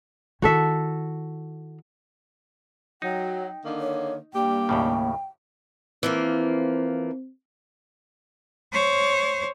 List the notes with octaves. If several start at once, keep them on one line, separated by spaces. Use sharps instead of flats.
D#3 E4 F#4 A4 E5
F#3 D#4 G5
D3 D#3 A#3
C#5
G2 G3 A#3 G4 G5
D#2 A2 C#3
E3 F3 A#3 C4
C5 C#5